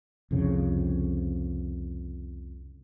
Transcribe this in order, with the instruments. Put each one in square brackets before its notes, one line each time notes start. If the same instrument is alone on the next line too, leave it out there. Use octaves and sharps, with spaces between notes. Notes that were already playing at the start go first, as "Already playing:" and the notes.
[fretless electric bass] C2 F2 C#3